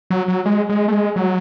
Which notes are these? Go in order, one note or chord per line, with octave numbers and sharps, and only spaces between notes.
F#3
F#3
G#3
G#3
A3
G#3
F#3